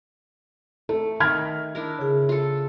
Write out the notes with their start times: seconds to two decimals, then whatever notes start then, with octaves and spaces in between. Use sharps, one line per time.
0.89 A3 A4
1.20 D#3 F6 G#6 B6
1.75 D4 E4 A#4
1.99 C#3 G#4
2.29 F4 A4